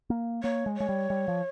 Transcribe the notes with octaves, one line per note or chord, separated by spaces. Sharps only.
A#3
A#3 C#5
G#3
G#3 C#5
G3
G3
F3